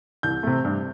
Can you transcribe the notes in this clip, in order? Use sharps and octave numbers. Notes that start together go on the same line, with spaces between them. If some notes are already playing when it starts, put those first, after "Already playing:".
C2 G6
C3 A3
G2